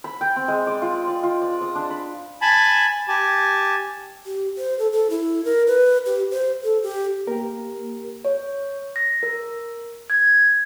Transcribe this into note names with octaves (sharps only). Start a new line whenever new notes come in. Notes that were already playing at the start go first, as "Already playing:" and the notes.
B5
G5
C4
G#3
D5
F4
D5
F4
D5
D#6
D4
B5
G#5 A5 B5
G4 G#5 A5
G4
C5
A4
A4
E4
A#4
B4
G4
C5
A4
G4
A#3 G4 A#4
C#5
A#6
A#4
G#6